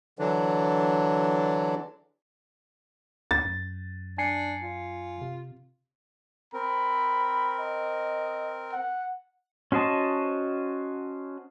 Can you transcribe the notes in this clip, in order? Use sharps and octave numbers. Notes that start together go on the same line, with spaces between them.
D3 E3 F#3 D4
D2 A6
F#2
D4 G#5 C7 C#7
F4
C3
C4 A#4 B5
D#5
F#5
C#4 F#4 C5 D#5 A5